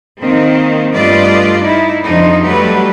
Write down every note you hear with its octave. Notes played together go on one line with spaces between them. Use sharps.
D#3 A#3 C4
G2 A3 F4 B4 D5 D#5
D#4 E4
F2 D3 F3 D#4
F#3 G3 A3 G4 B4 D5